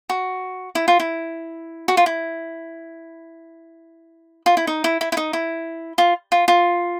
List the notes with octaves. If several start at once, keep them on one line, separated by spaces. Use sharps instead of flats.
F#4
E4
F4
E4
F#4
F4
E4
F4
E4
D#4
E4
E4
E4
D#4
E4
F4
F4
F4